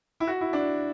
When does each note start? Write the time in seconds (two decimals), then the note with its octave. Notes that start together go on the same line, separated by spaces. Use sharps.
0.20 E4
0.27 F#4
0.41 E4
0.53 D4